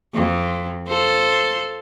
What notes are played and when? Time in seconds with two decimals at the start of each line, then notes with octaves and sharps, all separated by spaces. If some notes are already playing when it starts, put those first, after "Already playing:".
0.14 F2
0.88 F4 A4 C5